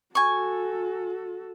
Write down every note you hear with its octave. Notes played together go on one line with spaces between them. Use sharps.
F#4 A4 G#5 C#6